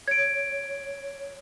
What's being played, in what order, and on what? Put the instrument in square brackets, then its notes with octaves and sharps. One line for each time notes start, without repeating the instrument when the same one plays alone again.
[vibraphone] C#5 [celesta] G#6 D7